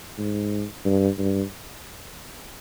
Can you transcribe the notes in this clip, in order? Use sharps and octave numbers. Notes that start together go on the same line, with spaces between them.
G#2
G2
G2